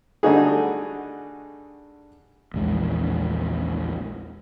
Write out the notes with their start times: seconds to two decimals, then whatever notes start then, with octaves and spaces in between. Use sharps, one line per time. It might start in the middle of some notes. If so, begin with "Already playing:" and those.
0.23 D3 G3 A3 D#4 F#4 G#4
2.54 A#1 E2 G#3